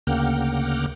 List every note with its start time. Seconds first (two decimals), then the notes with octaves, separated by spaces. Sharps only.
0.07 D2 C#3 A#3 F#5 G5 F6